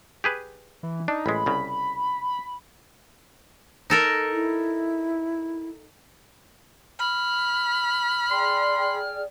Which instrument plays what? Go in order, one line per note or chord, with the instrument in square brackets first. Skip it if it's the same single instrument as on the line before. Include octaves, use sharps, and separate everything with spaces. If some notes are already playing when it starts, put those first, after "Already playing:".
[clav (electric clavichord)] G4 G#4 B4
[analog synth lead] E3
[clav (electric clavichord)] D4 [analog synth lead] D#4
[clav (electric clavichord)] A1 G#3 [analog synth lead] B5
[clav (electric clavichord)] C2 C#3
[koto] D#4 A4 A#4
[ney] E4
[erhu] B5 [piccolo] F6
[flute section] G#4 D5 G5 [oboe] C6